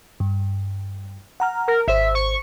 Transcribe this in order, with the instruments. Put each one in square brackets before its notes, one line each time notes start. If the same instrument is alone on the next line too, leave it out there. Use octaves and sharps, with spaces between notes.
[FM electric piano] G2
F#5 A#5 F6
[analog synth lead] A#4
[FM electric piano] G#1 C5 [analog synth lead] E5
[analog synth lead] C#6